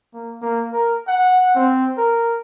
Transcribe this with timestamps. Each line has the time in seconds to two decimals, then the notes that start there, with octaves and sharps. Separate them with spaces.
0.13 A#3
0.41 A#3
0.73 A#4
1.07 F#5
1.55 C4
1.97 A#4